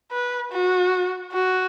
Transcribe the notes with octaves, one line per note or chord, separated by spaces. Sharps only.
B4
F#4
F#4